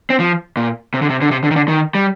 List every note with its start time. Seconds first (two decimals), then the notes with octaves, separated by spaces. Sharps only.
0.10 C4
0.20 F3
0.57 A#2
0.94 C3
1.02 D3
1.09 C3
1.22 D3
1.31 C3
1.44 D3
1.51 D#3
1.56 D3
1.68 D#3
1.95 G3